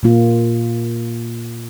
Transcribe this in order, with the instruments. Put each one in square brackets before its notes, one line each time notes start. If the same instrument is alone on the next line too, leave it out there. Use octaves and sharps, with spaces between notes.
[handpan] A#2 A#3 F4